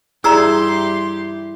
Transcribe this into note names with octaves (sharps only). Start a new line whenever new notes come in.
G2 E4 G4 G#4 D5 A#5 C6 E6